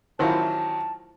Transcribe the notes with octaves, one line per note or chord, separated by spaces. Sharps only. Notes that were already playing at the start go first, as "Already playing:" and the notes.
A1 D#3 F#3 E4 F4 C5 A5